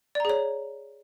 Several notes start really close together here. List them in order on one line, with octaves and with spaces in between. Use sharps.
D5 A#5 G#4 C#5